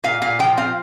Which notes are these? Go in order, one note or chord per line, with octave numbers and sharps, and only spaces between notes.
A#2 F5
A#2 F5
F3 G5
C4 F5